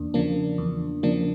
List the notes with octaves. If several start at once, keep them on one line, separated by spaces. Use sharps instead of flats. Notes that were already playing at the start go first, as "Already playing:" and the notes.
Already playing: E2 A#3 D4
C#3 F3 A#3 D4
E2
C#3 F3 A#3 D4